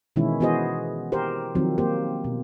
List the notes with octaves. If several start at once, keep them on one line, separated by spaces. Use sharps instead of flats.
B2 D#3 E3 G#3 C#4 E4
E3 B3 F#4 G#4 C5 D#5
G4 A#4 C5
D#3 F3 F#3 C4
A#3 G4 C5
B2